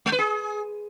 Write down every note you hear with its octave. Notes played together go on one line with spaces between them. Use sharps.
G#3
B4
G#4